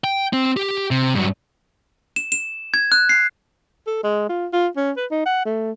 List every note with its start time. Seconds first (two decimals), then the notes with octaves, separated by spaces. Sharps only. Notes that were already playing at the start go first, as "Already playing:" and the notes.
0.04 G5
0.33 C4
0.57 G4
0.91 C3
1.15 G2 F#3
2.16 E7
2.32 E7
2.74 G#6
2.92 F#6
3.09 C7
3.87 A4
4.04 G#3
4.30 F4
4.53 F4
4.77 C#4
4.97 B4
5.11 D#4
5.26 F#5
5.45 A3